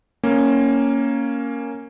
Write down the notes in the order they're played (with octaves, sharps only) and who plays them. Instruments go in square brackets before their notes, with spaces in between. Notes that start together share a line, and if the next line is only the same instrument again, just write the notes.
[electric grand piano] A#3 C#4